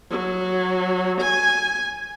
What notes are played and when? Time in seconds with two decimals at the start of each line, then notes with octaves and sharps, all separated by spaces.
0.10 F#3
1.22 G#5